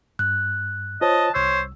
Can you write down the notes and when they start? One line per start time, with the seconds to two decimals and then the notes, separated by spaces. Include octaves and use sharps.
0.19 G2 F#6
1.01 F4 C5 C#5 D#5 A5
1.34 C2 C5 C#5 E6